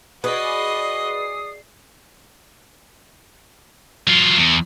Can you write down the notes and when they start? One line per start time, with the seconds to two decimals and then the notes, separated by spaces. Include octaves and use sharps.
0.24 F#4 G#4 B4 D5 D#5 D#6 C7
4.07 F#3 F4
4.38 E2